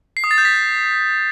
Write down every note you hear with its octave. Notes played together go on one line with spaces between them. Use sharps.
C7
D#6
A6
G6
B6